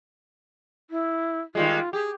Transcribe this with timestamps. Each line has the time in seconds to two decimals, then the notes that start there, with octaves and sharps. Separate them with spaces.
0.90 E4
1.55 D#3 G3 G#3 F4
1.93 G4 G#4